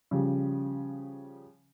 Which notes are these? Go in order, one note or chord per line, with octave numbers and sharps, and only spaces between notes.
C#3 F3 G3